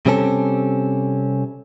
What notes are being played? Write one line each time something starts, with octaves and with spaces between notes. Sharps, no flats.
C3 G3 C4 C#4 A4